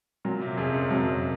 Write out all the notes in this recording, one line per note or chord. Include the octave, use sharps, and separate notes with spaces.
A#2 F#3
C3
F2 C#4 G#4
F#2
F2 F#3